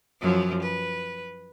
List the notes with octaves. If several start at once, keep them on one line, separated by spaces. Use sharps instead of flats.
F#2 F3 F#3
B4